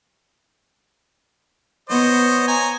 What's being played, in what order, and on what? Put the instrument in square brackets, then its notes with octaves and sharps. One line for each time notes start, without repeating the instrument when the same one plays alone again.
[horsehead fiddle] B3 [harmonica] C5 C#5 D#5
[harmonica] C#5 G#5 A#5